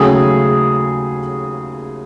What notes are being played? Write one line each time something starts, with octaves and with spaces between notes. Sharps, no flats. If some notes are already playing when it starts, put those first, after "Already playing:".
Already playing: D#2 C#3 F#3 A3 G#4